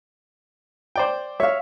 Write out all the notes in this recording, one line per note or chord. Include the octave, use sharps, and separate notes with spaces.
C5 D5 G5
C#5 E5 F5